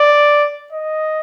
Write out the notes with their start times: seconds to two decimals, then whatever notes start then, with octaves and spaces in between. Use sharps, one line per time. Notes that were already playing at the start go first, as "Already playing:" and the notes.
Already playing: D5
0.72 D#5